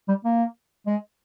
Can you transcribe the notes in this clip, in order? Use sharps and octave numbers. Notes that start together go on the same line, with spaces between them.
G3
A#3
G#3